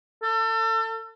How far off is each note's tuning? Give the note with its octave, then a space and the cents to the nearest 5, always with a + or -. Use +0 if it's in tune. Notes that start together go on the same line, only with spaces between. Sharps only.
A4 +30